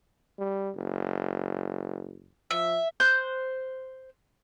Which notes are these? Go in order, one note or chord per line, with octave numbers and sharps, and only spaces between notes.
G3
F#1
F3 E5
C5 F#6 G6